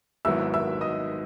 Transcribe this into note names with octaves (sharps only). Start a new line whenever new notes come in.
G#1 G#2 F#3 B3 E4 E5 E6
E5 E6
D#5 D#6